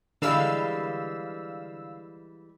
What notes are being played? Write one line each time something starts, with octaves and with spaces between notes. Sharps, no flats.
D3 E3 G3 G#3 F5 E6